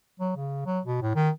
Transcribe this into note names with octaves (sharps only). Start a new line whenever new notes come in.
F#3
C#3
F#3
B2
A2
D#3